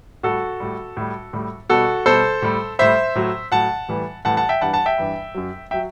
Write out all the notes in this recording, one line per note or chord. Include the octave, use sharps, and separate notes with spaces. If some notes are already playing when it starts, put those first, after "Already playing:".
A2 G3 F#4 A4
A2 G3
A2 G3
A2 G3
B2 G3 F#4 A4
B2 G3 A4 C5
A2 G3
A2 G3 C5 E5
A2 F#3
A2 F#3 F#5 A5
A2 E3 G3
A2 E3 G3 F#5 A5
F#5 A5
E5 G5
G2 E3 G3 F#5 A5
F#5 A5
E5 G5
G2 E3 G3
F#2 F#3
F#3 E5 G5